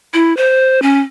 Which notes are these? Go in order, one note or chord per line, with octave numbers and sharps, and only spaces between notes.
E4
C5
C#4